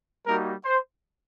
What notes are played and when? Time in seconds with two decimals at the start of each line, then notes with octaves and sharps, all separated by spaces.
0.25 G3 A#3 D#4 F#4 A#4
0.65 C5